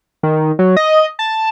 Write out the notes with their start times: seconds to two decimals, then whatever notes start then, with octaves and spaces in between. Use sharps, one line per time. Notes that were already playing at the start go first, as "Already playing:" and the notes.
0.23 D#3
0.59 F#3
0.77 D#5
1.19 A5